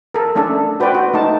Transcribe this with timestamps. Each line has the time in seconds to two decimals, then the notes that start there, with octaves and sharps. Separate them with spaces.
0.14 A4 A#4
0.35 A3 C#4 D4 A4
0.80 F#4 B4 C5 D5 G5
0.95 F#4
1.14 A3 D#4 A5